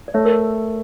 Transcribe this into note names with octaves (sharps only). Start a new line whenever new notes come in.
D5
A3 C#5 E5
A#4 D5